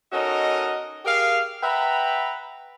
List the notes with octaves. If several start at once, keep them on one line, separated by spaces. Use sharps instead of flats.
C#4 D#4 F#4 A4 A#4 D#5
G4 G#4 A#4 F5
B4 E5 F#5 G5 A#5 B5